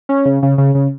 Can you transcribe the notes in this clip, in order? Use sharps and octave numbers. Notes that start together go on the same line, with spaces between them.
C#4
C#3
C#3
C#3
C#3